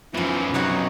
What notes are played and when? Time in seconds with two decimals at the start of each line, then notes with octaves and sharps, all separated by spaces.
0.14 B1 F#2 E3 F3 E4
0.54 B1 C3 D#4 F#4 C#5